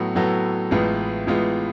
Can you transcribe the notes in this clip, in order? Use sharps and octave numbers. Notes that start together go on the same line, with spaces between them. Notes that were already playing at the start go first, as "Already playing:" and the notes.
Already playing: A2 F#3 B3 F#4 A4
A2 F#3 B3 F#4 A4
A1 A2 G#3 B3 F4
A1 A2 G#3 B3 F4